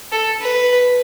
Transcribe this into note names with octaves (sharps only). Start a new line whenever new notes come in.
A4
B4